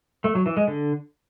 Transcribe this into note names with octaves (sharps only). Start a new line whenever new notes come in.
A3
F#3
E3
G#3
D3